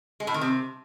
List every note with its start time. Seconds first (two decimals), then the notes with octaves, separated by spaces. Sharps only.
0.20 G#3
0.27 A2
0.34 D#3
0.41 C3